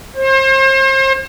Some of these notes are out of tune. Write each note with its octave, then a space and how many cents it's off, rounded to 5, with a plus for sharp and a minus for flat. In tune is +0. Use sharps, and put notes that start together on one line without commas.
C5 +35